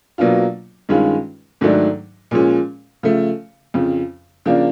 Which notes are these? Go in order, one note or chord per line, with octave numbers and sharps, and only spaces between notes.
B2 F#3 A#3 D4 F4
G2 D#3 G#3 C#4 F4
G#2 D#3 F#3 A3 D4
A#2 F3 G#3 C#4
C#3 F3 A3
F2 C#3 F3
C#3 F3 A#3 D4